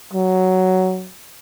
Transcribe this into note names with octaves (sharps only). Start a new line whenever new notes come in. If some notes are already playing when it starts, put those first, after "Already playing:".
F#3